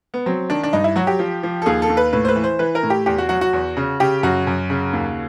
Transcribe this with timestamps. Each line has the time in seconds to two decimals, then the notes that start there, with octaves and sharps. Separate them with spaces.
0.14 B3
0.26 F#3 C4
0.50 D#3 D4
0.63 D4
0.73 G2 D#4
0.84 E4
0.96 F#3 F#4
1.07 G4
1.19 F3
1.43 F3
1.62 A4
1.66 D#2 G#4
1.82 A4
1.89 D#2
1.97 B4
2.13 A2 B4
2.25 C5
2.28 B4
2.36 E3
2.44 C5
2.59 E3 B4
2.75 A#4
2.83 A2
2.90 G4
3.06 E2 G4
3.18 F#4
3.29 F#3 F#4
3.41 F#4
3.53 E2
3.77 C#3
4.00 C#3 G4
4.23 F#2 F#4
4.47 F#2
4.70 C#3
4.93 D#2